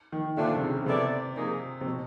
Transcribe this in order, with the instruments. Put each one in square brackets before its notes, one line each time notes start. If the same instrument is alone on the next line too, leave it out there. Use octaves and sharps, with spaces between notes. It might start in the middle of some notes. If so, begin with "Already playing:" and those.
[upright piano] D#3
[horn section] A#2 F3 A3 D4 [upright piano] D3
[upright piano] C3
C#3
C#3
[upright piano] C3 [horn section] B3 E4 A4 D5
[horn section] C3 F3 A#3 D#4 G#4
[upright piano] C3
B2